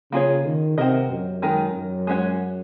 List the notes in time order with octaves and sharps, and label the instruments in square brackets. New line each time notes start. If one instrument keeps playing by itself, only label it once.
[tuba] C#3 [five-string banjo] A#3 F4 G#4 C#5
[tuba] D#3
[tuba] C3 [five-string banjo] C4 F#4 A#4 D#5
[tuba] F#2
[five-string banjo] D#3 G#3 D#4 A#4
[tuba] F#2
[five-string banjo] G#3 C#4 F#4 C#5